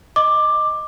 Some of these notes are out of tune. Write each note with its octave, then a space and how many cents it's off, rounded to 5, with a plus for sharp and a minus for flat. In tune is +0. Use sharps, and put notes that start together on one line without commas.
D#5 +0 D6 +10